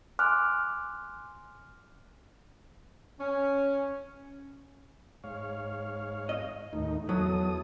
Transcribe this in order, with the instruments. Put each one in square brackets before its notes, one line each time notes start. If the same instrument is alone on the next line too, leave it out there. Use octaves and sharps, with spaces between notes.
[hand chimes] G#5 C6 D6 F6 F#6
[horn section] C#4
[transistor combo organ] G#2 C#5 F5
[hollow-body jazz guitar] D#5
[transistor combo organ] D#2 A2 D#4
[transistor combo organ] E2 A4 D#6 [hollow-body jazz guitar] F#3